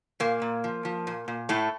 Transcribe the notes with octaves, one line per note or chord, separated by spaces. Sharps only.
A#2 A#3
A#2
F3
F3
A#2
A#2
A2 A3